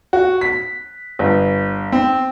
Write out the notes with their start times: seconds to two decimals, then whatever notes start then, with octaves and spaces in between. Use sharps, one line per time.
0.13 F#4
0.41 B6
1.19 G1
1.92 C4